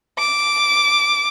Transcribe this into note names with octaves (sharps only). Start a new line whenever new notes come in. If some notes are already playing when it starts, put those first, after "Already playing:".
D6